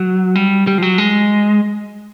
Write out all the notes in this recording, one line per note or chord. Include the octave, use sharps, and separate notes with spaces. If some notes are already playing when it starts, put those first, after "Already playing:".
Already playing: F#3
G3
G3
F3
F#3
G#3